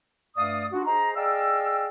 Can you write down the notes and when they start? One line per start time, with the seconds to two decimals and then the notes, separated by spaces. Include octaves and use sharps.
0.36 G2 A3 D5 F5 D#6
0.72 D4 F4 F#4
0.86 G#4 C5 D#5 A#5
1.15 G#4 D5 D#5 F5 G5 E6